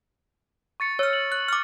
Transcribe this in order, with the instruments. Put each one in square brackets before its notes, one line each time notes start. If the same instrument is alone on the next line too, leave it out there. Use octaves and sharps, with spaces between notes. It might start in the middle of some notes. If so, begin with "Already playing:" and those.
[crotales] C#6 A6 C#7
[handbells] C#5 F6 [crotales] E6
[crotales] F#7
[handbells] F#6
D6 F6